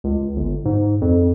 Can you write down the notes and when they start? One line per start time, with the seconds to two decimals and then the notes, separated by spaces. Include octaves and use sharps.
0.04 C#2
0.36 G1
0.65 G#2
1.01 F2